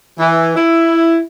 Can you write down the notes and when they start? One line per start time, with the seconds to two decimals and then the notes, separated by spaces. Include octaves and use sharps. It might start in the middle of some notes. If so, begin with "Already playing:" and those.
0.18 E3
0.56 E4